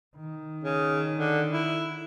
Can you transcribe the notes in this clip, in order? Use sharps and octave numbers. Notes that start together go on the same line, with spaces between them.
D#3
C#3
D3
E4